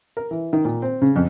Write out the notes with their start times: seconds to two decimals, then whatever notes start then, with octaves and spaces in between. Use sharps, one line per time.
0.17 A#4
0.31 E3
0.53 D#3
0.65 A#2
0.82 C4
1.02 C#3
1.16 F2